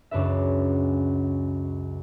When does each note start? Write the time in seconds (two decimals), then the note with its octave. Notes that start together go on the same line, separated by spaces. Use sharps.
0.11 C#2 F#2 D4 B4 E5